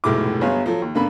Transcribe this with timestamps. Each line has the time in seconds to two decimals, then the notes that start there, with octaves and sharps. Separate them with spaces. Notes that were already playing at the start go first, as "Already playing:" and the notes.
0.04 F1 B1 A2 G#3 E4 D6
0.41 G1 F#3 B3 G#4 F5
0.66 F3 F#3 A4
0.82 D#2
0.95 G2 D3 A#3 B3 B5